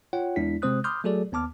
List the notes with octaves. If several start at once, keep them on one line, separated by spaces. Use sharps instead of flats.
F4 C#5 F#5 G5
E2 G#3 D4 E4 B6
C3 G#3 C4 C5 D#6 F#6
B5 C6 D6 D#6 F6 G6
F#3 A3 F#4 G#4 A4 D5
D#2 B3 A5 D6 F6